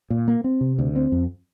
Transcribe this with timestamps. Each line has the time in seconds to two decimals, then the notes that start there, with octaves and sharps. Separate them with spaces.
0.10 A#2
0.28 A#3
0.44 C4
0.61 C3
0.79 D2
0.96 C4
1.12 F2